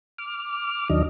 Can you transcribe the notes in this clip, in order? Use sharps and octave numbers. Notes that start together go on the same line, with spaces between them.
D6 F6
D#2 D#3 F#3 D4 D#5